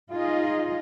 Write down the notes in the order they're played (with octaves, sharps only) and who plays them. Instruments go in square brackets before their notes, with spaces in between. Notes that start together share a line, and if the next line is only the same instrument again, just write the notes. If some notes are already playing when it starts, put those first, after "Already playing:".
[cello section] D#4 F4 G#4 D#5